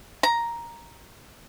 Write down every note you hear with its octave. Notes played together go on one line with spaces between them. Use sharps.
A#5